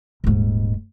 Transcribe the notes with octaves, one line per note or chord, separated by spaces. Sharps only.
D#1 G#2